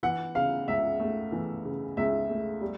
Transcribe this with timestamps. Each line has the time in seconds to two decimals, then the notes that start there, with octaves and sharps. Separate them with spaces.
0.03 E3 F#5
0.35 C#3 F5
0.68 C#2 E5
1.00 A3
1.32 E3
1.65 C#3
1.97 C#2 E5
2.30 A3
2.61 G3